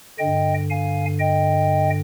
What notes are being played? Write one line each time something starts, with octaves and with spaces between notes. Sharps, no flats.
G2 D3 D#5 G5
F5 G#5
D#5 G5